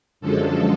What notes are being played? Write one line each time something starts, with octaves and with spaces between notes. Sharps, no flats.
F#2 D3 F3 G#3 A4